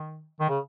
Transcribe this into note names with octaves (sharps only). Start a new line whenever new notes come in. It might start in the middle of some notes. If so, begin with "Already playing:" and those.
Already playing: D#3
D#3
C#3